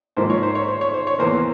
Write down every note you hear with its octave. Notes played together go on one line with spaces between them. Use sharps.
G#2 F3 A#3 C5
C#5
C5
C#5
C5
C#5
C5
C#5
E2 E3 A#3 C5